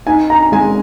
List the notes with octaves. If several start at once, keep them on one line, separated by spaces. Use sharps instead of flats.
D#4 G#5
A#5
G#3 G#5